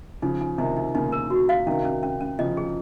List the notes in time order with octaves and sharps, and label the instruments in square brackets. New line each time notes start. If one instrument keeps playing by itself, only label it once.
[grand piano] C#3 F3 [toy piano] D#4
[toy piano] D#4
[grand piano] C3 D#3 [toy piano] D#4
[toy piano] D#4
[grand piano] A#2 C#3 [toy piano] D#4
[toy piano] A#4
F#4
F5
[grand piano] C3 D#3 [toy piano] C#4
[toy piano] C#4
C#4
C#4
[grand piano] C#3 F3 [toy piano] D#5
[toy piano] G#4